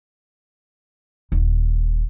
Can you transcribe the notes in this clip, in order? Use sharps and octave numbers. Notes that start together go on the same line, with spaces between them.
D#1